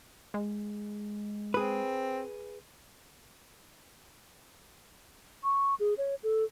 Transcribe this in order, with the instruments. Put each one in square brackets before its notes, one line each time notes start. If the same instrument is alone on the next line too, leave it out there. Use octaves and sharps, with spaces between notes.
[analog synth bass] G#3
[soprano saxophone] C4 [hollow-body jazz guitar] G#4 B4
[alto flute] C#6
G#4
C#5
A4